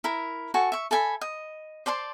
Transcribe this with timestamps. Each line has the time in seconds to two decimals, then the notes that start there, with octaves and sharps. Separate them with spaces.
0.04 E4 A#4
0.54 F#4 A4 G#5 C#6
0.72 E5 C#6
0.91 A4 E5 G#5 B5
1.21 D#5
1.86 C5 D5 A5 C6